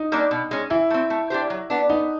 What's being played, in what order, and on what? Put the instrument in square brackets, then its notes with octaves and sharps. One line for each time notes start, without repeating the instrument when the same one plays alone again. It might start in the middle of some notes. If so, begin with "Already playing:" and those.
Already playing: [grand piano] D#4
[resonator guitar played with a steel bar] G3 A#3 D4
B2
G#3 C#4
[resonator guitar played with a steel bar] E3 [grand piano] E4
[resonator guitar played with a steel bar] A3 C4
A3
D4 G4 C5
F#3
B3 D4
[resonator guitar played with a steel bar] B3 [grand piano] D#4